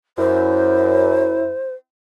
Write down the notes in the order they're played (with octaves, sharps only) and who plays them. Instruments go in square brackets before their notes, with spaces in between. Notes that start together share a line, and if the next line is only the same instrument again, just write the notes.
[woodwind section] F#2 [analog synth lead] E4 [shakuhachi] C5